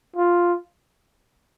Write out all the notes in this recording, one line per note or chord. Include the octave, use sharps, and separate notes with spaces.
F4